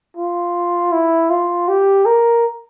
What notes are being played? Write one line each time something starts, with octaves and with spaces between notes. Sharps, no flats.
F4
E4
F4
G4
A#4